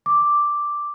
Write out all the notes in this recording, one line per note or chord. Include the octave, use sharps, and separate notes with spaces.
D6